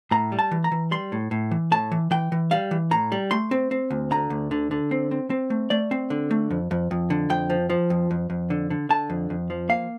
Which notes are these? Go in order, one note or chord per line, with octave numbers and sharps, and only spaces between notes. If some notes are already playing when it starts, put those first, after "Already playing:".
A2 A#5
G3
A5
E3
A#5
E3
G3 C6
A2
A2
E3
A2 A5
E3
E3 G5
E3
G3 F5
E3
A2 A#5
G3
A3 C6
C4
C4
D2
D3 A#5
D2
D3
D3
C4
C4
C4
A3
A3 D5
C4
D3
A3
F2
F2
F2
D3
F2 G5
F3
F3
F2
F2
F2
D3
D3
D3 A5
F2
F2
F3
A#3 F5